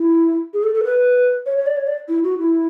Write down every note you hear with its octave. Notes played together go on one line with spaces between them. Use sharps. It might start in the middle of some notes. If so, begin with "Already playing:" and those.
Already playing: E4
G#4
A4
A4
B4
C#5
C#5
D5
C#5
D5
E4
F#4
E4